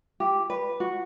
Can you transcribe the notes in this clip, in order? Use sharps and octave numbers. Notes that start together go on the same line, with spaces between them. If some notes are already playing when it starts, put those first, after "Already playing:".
G4
B4
F#4